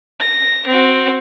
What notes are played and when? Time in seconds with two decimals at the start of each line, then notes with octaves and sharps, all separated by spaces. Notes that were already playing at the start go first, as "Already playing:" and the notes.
0.20 A#6
0.67 C4 F#4